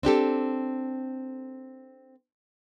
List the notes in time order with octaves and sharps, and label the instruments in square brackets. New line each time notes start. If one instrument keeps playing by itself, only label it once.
[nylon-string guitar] C4 D4 G4 A4